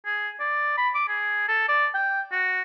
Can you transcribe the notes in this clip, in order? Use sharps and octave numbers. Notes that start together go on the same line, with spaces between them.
G#4
D5
B5
D6
G#4
A4
D5
G5
F#4